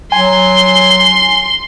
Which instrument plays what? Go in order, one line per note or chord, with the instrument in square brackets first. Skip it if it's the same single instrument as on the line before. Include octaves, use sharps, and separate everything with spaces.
[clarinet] F#3 [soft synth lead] G#5 [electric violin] C6